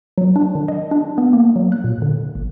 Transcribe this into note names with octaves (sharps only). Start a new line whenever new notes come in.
F#3
D4
D#3
D#5
D4
B3
A#3
F#3
F#6
A#2
D3
G#1